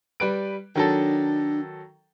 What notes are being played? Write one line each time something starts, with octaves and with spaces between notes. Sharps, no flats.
G3 B4 D7
D#3 F#3 D4 A4